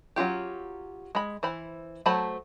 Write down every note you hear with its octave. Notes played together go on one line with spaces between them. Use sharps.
F#3 C#4 F4 G4
G#3 B5
E3 C5 B5
F#3 A3 C5 A5 B5